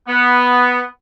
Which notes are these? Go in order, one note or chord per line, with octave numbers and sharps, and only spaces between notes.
B3